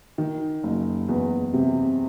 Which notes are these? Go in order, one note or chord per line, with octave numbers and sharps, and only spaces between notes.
D#3
F#1
E2
C3